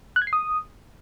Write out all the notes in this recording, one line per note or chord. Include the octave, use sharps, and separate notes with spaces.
F#6
G#6
C7
D#6